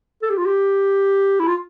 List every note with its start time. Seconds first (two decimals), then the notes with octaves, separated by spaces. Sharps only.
0.23 A4
0.30 G4
0.38 F4
0.46 G4
1.40 E4
1.47 F4